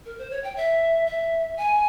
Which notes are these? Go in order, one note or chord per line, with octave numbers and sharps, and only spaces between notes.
A#4
C5
C#5
G5
E5
E5
G#5